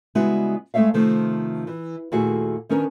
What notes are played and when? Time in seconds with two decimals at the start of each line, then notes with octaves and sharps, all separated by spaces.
0.15 C#3 G3 G#3 B3 E4 F#4
0.74 G#3 A3 B3 C#5 E5 F5
0.94 C3 D#3 F3 A3 C4
1.67 E3
2.12 D#2 A#2 A3 E4 F#4 G#4
2.69 D#3 B3 C#4 D4 A#4